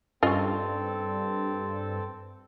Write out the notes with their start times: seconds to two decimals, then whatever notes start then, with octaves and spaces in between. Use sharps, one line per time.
0.23 G2 C4 C#4 F4 A4 D#5 C#6